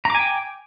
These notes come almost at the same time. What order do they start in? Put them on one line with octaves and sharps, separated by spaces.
A#5 D6 G#5 G5